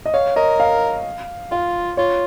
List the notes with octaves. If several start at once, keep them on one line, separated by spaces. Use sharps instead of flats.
D#5
C#5 F5
A#4 D#5
F5
F4 F5
F4 C#5